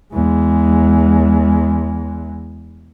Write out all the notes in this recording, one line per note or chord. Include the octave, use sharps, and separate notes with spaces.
E2 G#3